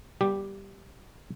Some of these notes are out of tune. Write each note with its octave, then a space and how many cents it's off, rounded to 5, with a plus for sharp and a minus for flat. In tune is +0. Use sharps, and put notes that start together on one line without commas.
G3 +0 B3 -35 G4 +0